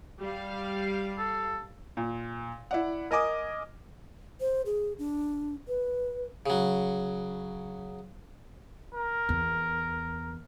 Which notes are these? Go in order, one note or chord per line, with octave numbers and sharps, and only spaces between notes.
G3 F5
A4
A#2
E4 D5 F#5
A#4 D#5 G#5 D6 D#6
C5
G#4
D4
B4
C#3 F#3
A#4
E2